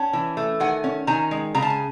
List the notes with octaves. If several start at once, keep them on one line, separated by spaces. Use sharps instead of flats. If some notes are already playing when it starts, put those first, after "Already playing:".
Already playing: C#4 G5 A5
E3
A3
D#3 F#5 G#5
C#4
D#3 G#5 A#5
G#3
C#3 A#5
A5
G#5